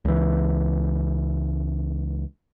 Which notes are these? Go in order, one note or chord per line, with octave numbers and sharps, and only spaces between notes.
C#2 E3